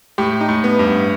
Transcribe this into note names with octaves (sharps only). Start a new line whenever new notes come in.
A2 G4
D#4
A2
B3
G2
B3